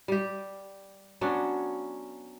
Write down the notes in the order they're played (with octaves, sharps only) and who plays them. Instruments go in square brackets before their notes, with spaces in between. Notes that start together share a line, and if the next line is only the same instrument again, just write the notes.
[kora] G3 G4
F#3 B3 C#4 D4